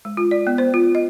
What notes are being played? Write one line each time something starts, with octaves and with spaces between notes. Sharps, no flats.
G#3
F4
D5
B3
C5
F4
D#5